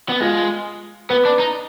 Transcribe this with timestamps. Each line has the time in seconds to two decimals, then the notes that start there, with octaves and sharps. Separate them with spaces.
0.09 B3
0.20 G#3 F4
1.10 B3 B4
1.25 D4
1.39 D#4